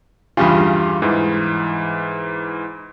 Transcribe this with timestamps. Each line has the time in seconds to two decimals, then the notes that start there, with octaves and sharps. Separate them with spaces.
0.37 E2 G2 C#3 F4 G4 B5
1.02 G#2 E3